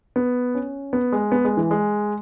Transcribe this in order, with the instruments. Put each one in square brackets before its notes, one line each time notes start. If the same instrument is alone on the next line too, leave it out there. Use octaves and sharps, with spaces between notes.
[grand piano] B3
C#4
B3
G#3
B3
G#3
E3
G#3